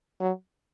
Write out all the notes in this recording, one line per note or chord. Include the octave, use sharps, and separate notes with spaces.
F#3